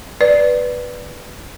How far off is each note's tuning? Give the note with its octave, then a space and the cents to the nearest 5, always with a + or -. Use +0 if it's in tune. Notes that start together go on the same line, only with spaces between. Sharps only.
B4 +0 D5 +0